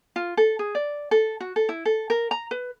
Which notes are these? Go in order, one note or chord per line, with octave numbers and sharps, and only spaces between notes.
F4
A4
G#4
D5
A4
F#4
A4
E4
A4
A#4
A#5
B4